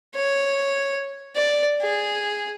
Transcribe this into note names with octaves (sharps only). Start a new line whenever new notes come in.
C#5
D5
G#4